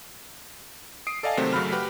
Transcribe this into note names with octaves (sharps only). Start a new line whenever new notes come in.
D#6 C7 D7
A4 D5 D#5 F5 G#5 A5
C3 D#3 F#3 A3 C4
F#2 C#3 F#3 A3 B5 F6
F#4 G4 B4